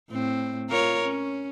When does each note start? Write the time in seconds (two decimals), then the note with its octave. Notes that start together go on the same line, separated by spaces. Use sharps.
0.10 A2 C4
0.69 F4 A#4 C#5
1.04 C#4